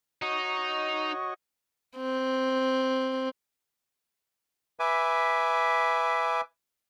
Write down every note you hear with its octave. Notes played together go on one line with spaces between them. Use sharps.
D#4 F#4 C#5 D#5
C4
B4 E5 G#5 D6